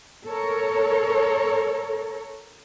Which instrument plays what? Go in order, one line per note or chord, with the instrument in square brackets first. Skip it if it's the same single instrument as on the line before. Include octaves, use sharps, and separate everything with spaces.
[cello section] A4 A#4 C#5